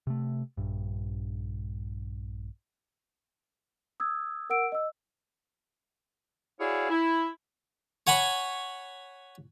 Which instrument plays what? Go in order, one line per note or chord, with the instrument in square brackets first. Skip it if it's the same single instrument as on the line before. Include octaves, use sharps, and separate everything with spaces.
[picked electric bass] C3 A3
A#1 G2
[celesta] D#6 E6 G#6
A#4 F#5 E6 D7
D#5 E6
[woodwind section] E4 F#4 G#4 C#5 D5 F5
E4
[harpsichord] C#5 F#5 G#5 B5 C#6